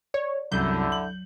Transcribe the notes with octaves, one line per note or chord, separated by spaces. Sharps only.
C#5 D5
C2 F#2 D3 F#3 E4 G6
F#7